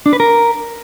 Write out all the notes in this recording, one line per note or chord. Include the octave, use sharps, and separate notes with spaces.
D4
B4
A#4